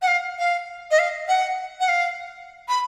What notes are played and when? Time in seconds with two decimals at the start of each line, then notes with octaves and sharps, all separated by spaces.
0.02 F#5
0.07 F5
0.38 F5
0.91 D#5
0.99 F5
1.28 F#5
1.80 F#5
1.88 F5
2.68 B5